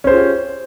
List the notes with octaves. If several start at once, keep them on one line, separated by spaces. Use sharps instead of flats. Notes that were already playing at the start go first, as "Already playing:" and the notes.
C#4 F4 G4 G#4 C5